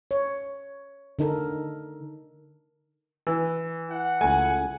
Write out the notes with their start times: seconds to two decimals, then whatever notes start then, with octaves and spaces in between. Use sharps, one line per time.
0.11 C#5
1.19 D3 D#4 A4 A#4
3.27 E3
3.91 E4 F#5
4.21 C#2 A3 G#5